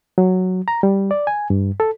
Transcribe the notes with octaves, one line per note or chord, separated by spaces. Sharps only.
F#3
A#5
G3
D5
G#5
G2
A4